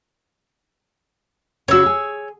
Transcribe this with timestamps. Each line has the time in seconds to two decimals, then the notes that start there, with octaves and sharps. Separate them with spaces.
1.68 C#3 F#4 C#5 E6
1.86 G#4